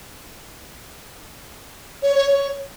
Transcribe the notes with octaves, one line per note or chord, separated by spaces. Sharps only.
C#5
C#5
C#5